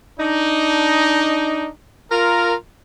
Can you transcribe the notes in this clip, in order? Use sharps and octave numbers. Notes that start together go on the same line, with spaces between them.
D4 D#4
F4 A#4